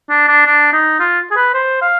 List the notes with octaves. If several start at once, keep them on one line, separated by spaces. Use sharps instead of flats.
D4
D4
D4
D#4
F4
G#4
B4
C5
F5